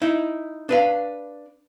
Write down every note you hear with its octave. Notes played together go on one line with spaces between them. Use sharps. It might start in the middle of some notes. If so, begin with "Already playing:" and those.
D#4 E4
D4 B4 F5